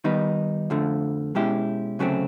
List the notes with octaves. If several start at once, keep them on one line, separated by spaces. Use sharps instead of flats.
D#3 G3 B3 D#4
F2 D3 F3 A3
B2 G#3 C#4 E4 G4
D2 C#3 F#3 A3 C4